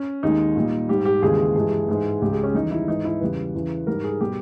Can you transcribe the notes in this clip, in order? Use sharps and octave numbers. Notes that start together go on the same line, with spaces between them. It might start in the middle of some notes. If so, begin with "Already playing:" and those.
Already playing: C#4
D#2 D#3 G#3 D#4
A#2 G3
G#2 G3 G4
G4
D#2 C#3 E3 G#3 G#4
G2 E3 G#3 G#4
G#2 E3 G#3
C#2 C#3 G#3 G4
G#4
C#4
E2 D#3 G3 D#4
E4
G#2 E3 G#3 D#4
E4
E2 C#3 G3 B4
E2 C#3 E3
G#2 G3 A#4
G#4
B2 G3 G4